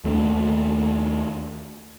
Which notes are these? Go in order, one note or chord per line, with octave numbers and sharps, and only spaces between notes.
D#2 A3 C4 D4